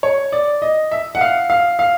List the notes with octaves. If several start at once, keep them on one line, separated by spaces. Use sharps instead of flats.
C#5
D5
D#5
E5
F#5
F5
F5
F5